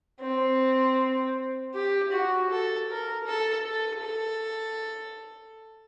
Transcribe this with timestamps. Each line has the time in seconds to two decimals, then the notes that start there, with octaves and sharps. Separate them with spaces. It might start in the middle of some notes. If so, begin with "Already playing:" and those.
0.20 C4
1.75 G4
2.12 F#4
2.50 A4
2.90 A#4
3.27 A4
3.66 A4
4.04 A4